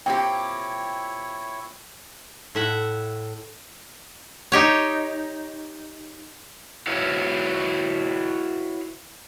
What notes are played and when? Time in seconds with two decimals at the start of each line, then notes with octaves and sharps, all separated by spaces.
0.06 A#2 C4 E4 G4 C#5 G5
2.55 A2 E5 F#5
4.52 D#4 G4 C#5
6.87 E4 F#4 B4 C#5 F5